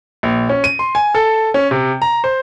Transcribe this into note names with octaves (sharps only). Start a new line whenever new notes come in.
A#1
C#4
D#7
C6
G#5
A4
C#4
C3
A#5
C5